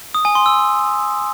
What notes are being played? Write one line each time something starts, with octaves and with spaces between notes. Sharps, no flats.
D#6
G#5
C6
E6